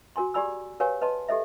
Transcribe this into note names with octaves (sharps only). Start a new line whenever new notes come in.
F#4 A#4 G#5 C6
G4 G#4 D5 G#5 B5 E6
G4 A#4 B4 C#5 F5 G#5
B4 D#5 A5 C6
G4 A4 D#5 E5